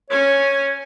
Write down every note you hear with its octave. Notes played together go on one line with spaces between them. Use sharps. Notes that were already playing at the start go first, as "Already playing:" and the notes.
C#4 C#5 G#5